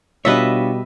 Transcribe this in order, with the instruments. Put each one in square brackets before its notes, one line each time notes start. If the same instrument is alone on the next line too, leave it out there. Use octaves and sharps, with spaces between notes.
[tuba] B2 [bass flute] G3 [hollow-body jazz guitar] D4 F4 C#5 [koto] B4 D#5 E5